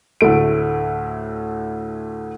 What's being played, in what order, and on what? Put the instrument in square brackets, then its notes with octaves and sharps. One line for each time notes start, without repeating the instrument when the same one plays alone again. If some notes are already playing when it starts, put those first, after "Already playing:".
[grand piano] D2 A2 A3 D7